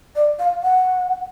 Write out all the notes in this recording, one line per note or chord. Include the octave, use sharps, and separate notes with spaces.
D5
F5
F#5